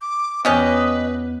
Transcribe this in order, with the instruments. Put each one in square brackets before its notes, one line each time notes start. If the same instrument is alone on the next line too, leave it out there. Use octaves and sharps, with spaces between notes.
[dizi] D6
[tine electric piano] E2 B3 [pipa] B2 C#4 G4 [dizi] B4 [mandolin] D#5